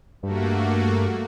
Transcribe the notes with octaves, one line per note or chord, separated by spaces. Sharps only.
G2 A3 A#3 F#4